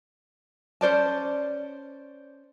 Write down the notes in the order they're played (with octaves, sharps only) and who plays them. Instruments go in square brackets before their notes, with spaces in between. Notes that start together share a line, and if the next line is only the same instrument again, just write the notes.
[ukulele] C#4 C5 D5 A5